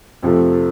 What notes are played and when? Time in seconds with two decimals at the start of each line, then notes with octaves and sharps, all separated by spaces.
0.23 F2 C3 F3 A3